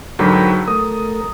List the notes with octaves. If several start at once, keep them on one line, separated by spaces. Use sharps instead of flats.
G#2 D3 F#3 A#4 G5 B5
A3 A#4 D#6